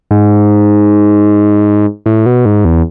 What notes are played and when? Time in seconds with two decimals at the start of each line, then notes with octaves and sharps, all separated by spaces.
0.11 G#2
2.06 A2
2.26 B2
2.46 G#2
2.65 E2